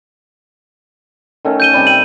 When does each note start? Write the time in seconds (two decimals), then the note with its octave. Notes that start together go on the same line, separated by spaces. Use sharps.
1.45 D#3 A3 C#4
1.60 G6 D#7 G7
1.72 C3 G3 A5
1.87 D#7 F#7